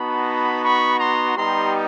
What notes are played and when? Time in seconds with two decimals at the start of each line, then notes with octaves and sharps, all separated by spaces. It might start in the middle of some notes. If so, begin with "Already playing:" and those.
Already playing: B3 D#4 F#4 A5 B5
0.63 B5 C#6
0.99 A#5 C6
1.35 G3 B3 D#4 G4 A#5 C6